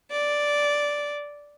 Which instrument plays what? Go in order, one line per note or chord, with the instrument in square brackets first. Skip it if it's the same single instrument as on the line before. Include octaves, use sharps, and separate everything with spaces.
[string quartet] D5